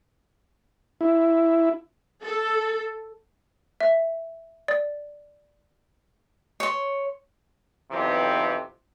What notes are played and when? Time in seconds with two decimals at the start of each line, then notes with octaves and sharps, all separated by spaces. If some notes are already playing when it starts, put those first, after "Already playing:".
1.01 E4
2.23 A4
3.81 E5
4.68 D5
6.60 C#5 C6
7.91 B1 F2 C3 E3